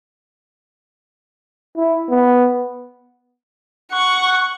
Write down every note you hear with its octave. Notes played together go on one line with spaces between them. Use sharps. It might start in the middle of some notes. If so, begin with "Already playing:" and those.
E4
B3
F#5 C#6